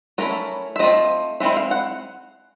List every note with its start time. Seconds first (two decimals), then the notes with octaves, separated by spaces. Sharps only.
0.18 A3 C#4 E4 A#4
0.76 E5
0.79 A3 C4 F4 D#5
1.40 G#3 C4 E4 E5
1.57 F5
1.71 F#5